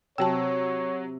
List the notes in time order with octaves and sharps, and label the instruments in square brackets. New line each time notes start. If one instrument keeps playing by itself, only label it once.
[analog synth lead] C3 [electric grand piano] F#3 E6 [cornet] C#5 [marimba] G5 A5